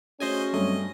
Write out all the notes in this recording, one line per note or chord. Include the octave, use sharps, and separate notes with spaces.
A3 C#4 F#4 G#4 C5 D#5 G#5
G2 F#3 A3 C4 D#5